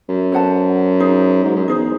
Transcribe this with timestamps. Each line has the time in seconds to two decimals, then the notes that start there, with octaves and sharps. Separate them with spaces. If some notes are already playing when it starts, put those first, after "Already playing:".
0.09 F#2
0.32 A4 C5 F#5 A5
1.00 D#4 G#4 C5
1.44 G#2
1.56 F#2
1.68 E2 D#4 G#4 C5